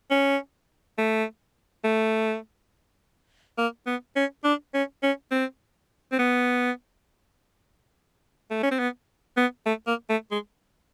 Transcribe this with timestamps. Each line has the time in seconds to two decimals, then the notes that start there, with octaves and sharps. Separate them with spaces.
0.11 C#4
0.98 A3
1.84 A3
3.58 A#3
3.87 B3
4.16 C#4
4.44 D4
4.74 C#4
5.03 C#4
5.31 C4
6.12 C4
6.19 B3
8.51 A3
8.63 C#4
8.71 C4
8.79 B3
9.37 B3
9.66 A3
9.87 A#3
10.10 A3
10.31 G#3